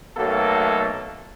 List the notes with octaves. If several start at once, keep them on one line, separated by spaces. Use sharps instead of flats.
B1 B2 F#3 A3 A#3 A4